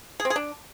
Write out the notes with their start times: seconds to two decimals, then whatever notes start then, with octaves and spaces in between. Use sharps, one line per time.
0.20 G#4
0.25 C4
0.30 G#4
0.36 D4